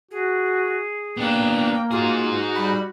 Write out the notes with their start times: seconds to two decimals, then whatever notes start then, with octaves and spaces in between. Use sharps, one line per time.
0.11 F#4 G#4
1.17 A#3 B3 D4 G5
1.91 D#4 F4 F#4 G#4
2.55 G3 B5